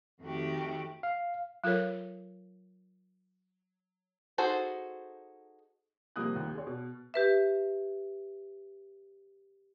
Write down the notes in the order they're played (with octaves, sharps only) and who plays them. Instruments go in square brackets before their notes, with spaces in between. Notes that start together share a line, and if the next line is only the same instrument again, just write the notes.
[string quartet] F2 D#3 A3 F#4 G4
[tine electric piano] F5
[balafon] F#3 F4 A4 A#4 C#5
[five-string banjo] D#4 F#4 G#4 A4 C5
[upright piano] C2 C3 F3 A#3 D#6 F#6
D#2
G#4 C#5
B2
[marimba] G4 B4 E5